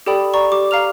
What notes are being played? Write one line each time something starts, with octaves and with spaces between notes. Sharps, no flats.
G4 A4 D5 G5 B5 D#6
D5 A#5 C#6
G4 D6
F5 A#5 F6 F7